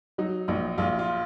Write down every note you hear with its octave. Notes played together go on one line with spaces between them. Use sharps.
F#3 D#4
A#1 D#4
A#1 F4
F4